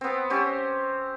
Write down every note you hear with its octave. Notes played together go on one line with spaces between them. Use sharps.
B3 C4
C4 C#4 G4